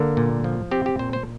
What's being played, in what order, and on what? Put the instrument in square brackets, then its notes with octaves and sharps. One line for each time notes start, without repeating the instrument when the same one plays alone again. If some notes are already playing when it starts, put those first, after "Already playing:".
Already playing: [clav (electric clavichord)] D3 A#3 A#4
A#2
F3
C4 G4
G4
A#2 C5
C5